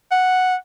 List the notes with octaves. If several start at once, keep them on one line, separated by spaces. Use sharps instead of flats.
F#5